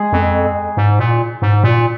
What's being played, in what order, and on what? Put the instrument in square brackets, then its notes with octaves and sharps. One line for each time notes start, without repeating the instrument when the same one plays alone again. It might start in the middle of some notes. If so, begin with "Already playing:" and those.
Already playing: [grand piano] G#3 G#4
[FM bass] F2
G#2
A#2
G#2
A#2